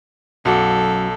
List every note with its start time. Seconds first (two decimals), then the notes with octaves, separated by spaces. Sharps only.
0.45 B1 F#2 F#4 A4 D6